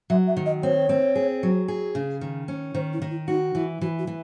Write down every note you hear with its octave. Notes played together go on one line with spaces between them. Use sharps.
F#3 E5
E5
D#3
D#5
C4 C#5
C4
G#4
F#3
G#4
C#3
D#3
C#4
D#3 C5
E4
D#3
E4
D#4 F#4
E3 E4
E3 F#4
F#4
E3